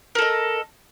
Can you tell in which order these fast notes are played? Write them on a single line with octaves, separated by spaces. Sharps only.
A#4 A4 D#5